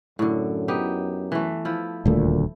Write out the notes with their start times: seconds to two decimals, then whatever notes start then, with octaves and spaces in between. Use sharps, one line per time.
0.19 F#2 A2 D3
0.68 B3 D#4 G4
1.32 E3 A3
1.65 F3 E4
2.06 D#1 D2 A#2 A3